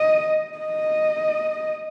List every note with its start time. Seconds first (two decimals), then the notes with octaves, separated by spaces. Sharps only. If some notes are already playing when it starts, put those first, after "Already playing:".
Already playing: D#5
0.59 D#5